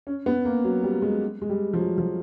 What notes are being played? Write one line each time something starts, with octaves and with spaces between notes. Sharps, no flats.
C#4
B3
A#3
F#3
G3
G#3
G#3
G3
F3
F#3
F3